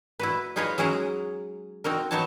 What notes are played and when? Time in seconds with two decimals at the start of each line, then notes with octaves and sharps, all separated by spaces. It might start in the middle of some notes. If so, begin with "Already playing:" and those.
0.19 E4 F#4 B4
0.56 D#4 F4 G#4 B4 C#5 D#5
0.78 F#3 G#3 C#4 G#4 F#5 A#5
1.84 C4 D#4 F#4 A#4
2.11 F#3 B3 D#4 F#4 C#5 A5